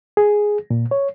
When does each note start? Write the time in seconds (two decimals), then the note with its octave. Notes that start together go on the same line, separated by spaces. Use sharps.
0.17 G#4
0.70 A#2
0.91 C#5